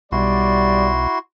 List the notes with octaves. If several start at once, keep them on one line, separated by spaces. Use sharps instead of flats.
B1 G3 E4 F#4 D5 C6